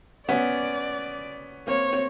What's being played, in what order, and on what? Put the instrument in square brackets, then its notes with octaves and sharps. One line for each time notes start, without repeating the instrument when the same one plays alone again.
[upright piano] B3 C#4 [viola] D5
[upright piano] A#3 C4 [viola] C#5
[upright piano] C4